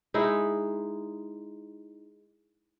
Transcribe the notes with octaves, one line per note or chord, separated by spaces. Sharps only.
G#3 D#4 E4